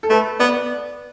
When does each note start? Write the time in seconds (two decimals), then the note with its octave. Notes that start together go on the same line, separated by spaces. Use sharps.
0.03 A4
0.10 A3 B4
0.39 B3 D5